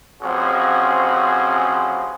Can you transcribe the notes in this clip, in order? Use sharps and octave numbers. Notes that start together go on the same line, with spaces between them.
A1 F3 C4 C#4 F#4 G#4